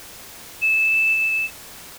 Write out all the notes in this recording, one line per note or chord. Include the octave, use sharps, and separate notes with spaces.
E7